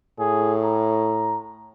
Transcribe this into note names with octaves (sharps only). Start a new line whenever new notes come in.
A2 G#4
A#5